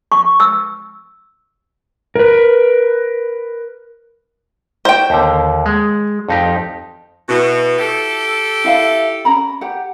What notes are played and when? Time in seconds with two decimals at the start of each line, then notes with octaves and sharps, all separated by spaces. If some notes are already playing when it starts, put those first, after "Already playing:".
0.12 C#6
0.40 E6
2.16 A#4 B4
4.85 C5 G5
5.10 D#2 D3
5.66 G#3
6.29 F2 D#4 G4
7.29 B2 E4 F#4
7.79 G4 A4
8.64 E4 E5 F5
9.25 C#4 A#5 B5
9.61 G4 F#5